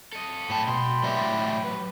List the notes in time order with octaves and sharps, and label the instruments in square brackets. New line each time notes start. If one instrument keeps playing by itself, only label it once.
[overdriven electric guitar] A4 D#5
[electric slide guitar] A2 A5 [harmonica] G5 B5
[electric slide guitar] B2 [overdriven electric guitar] C6
[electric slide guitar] A2 D5 E5 [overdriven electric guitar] F#3 G4
[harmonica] B4